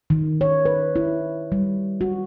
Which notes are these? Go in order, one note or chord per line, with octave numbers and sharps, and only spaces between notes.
D#3
C#5
B4
E4
G3
F#4